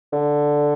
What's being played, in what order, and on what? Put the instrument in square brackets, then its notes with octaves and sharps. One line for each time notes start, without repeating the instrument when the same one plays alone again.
[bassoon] D3